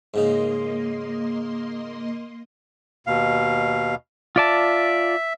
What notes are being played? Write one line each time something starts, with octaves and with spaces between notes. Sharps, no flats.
G#2 C#3 A#3 D#4 D#5 C6
D#2 B2 F5
F4 D5 E5 A5